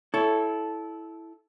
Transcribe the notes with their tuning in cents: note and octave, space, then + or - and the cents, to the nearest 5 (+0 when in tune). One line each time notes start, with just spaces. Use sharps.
E4 +0 A4 -15 C#5 +5